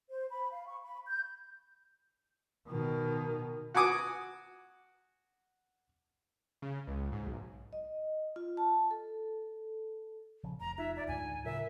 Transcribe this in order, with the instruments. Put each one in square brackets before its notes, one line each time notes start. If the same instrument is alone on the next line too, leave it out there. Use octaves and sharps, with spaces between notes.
[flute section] C5
B5
F5
C#6
B5
G6
[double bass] B2 D#3
[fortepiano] F#4 F#5 G#5 D6 D#6
[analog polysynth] C#3
C#2
G#2
B1
[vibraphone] D#5
F4
A5
A4
[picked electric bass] A#1 C#3 F3
[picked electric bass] F1 [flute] A#5
[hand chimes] D#4 F4 [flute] E5
[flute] D5 [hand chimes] A#5
[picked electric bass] D2 G#2 D3 [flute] G#5
[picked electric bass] A2 C#3 F#3 [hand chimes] F4 A#4 [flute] E5